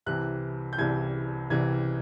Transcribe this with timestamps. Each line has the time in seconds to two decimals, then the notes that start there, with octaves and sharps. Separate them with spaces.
0.06 C2 C3 E3 F#6
0.73 G6
0.78 C2 C3 E3 G#6
1.50 C2 C3 E3 G#6